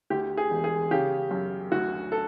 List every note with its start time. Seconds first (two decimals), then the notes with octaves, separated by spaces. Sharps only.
0.10 D2 G4
0.37 G#4
0.51 E1
0.64 G#4
0.91 C#3 G4
1.31 F#2
1.72 D2 F#4
2.12 A4